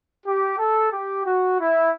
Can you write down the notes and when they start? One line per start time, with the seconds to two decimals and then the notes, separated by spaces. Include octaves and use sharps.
0.24 G4
0.58 A4
0.92 G4
1.25 F#4
1.59 E4